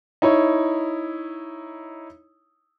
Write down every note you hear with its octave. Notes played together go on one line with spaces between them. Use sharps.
D#4 E4 C#5